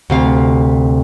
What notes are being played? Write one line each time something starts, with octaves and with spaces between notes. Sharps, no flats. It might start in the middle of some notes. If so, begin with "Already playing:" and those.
D2 C3 F5